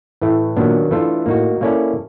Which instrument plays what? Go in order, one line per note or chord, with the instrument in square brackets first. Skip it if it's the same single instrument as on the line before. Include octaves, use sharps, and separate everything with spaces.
[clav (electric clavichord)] A2 E3 A3
[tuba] A#2 [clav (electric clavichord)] D#3 F#3 B3 D4
[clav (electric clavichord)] E3 A3 D4 F4 A4
[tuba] A2 [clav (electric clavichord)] A#3 D#4 F#4
[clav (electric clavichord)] A#3 C#4 E4 A4 D5